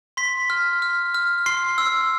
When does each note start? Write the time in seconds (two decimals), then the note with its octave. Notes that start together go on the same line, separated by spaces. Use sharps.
0.17 C6 B6
0.50 F6
0.82 F6
1.14 F6
1.46 C6 C7
1.78 E6